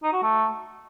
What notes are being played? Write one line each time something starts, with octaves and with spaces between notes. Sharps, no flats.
D#4
F#4
A3